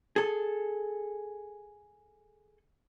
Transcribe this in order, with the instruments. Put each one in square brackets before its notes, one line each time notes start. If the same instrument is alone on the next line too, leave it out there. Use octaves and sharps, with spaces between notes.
[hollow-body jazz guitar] G#4 A4